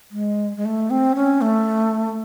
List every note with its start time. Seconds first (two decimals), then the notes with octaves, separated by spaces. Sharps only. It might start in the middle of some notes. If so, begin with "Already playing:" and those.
0.11 G#3
0.57 G#3
0.65 A3
0.90 C4
1.15 C#4
1.41 A3